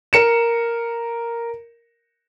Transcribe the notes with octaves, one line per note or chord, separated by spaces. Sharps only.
A#4 C#7 E7